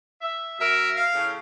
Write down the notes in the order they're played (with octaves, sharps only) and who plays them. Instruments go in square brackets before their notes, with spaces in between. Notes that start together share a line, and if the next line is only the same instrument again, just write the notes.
[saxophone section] E5
[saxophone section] F#2 A#4 [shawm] E5
[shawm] F5
[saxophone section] A2 C#3